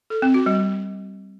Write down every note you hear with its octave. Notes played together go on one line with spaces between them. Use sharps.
A4
C4
F#4
G3